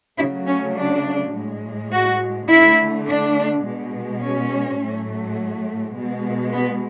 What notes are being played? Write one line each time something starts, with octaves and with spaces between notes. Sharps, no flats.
C#3 F#3 A3 E4
C#4
D4
A2 G#3
F#4
D3 A3 E4
D4
B2 G#3
C#4
A2 F#3 A3
B2 G#3
B3